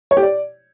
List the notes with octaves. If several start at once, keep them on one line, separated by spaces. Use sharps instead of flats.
C#5
G4
D5